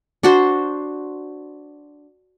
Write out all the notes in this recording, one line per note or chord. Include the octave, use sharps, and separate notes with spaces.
D4 F#4 C5